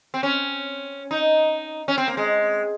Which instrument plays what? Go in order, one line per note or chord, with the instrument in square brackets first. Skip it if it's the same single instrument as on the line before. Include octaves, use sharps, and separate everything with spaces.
[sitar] C4
C#4
D#4
C#4
C4
A#3
G#3